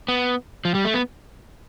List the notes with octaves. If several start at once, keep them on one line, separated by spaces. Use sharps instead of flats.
B3
F3
G3
A3
B3